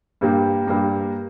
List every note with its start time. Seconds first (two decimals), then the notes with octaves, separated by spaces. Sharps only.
0.21 G2 G3 A#3
0.67 G2 G3 A#3